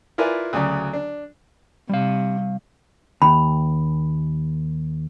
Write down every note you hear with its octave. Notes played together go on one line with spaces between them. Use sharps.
E4 F4 A#4 B4 D5 G#5
D2 C#3 F#3 D5
D4
C3 G3 F5
D#2 B5